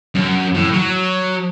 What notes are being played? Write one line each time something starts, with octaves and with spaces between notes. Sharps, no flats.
F#2
A2
F#3